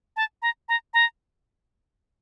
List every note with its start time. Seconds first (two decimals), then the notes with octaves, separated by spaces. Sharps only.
0.16 A5
0.42 A#5
0.68 A#5
0.94 A#5